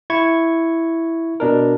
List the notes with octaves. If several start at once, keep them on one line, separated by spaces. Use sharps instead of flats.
E4 C#6 G#6
B2 D4 A#4